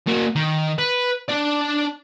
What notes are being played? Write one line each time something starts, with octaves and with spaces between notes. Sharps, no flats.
A#3 F#4
D#3
B4
D4 D5